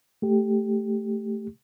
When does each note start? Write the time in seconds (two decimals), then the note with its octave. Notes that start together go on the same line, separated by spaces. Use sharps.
0.22 A3 G4